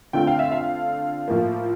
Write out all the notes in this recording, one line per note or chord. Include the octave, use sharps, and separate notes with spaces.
D3 A3 C4 F4 G5
F5
E5
F5
A2 F3 A#3